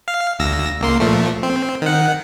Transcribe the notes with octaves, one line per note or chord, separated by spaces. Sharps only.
F5
D2 E6 A#6
C#2 A#3 C6
A#2 F3 A3
C4
D#3 F#5